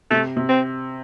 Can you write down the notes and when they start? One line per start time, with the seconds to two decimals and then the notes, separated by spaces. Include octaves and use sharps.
0.10 C3 A3
0.37 C3
0.49 C4